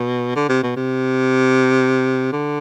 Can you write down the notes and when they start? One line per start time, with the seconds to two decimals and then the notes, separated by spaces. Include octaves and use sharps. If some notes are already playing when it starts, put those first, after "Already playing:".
Already playing: B2
0.36 D3
0.49 C3
0.63 B2
0.76 C3
2.32 D3